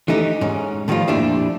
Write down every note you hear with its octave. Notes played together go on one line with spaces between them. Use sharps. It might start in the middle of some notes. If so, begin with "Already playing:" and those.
E3 A3 D#4 G4
G#2 C#4
A2 D#3 F3 G3 F4
F2 A#2 D4 E4 G4